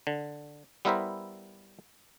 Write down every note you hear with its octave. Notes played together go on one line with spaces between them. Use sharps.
D3
G3 B3 E4 A#4 C5 E5